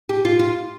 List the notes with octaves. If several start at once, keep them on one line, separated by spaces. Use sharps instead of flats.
G4
F4
F4